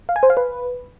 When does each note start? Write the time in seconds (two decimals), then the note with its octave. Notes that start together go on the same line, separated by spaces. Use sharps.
0.09 F5
0.16 G#5
0.23 C5
0.30 F5
0.37 B4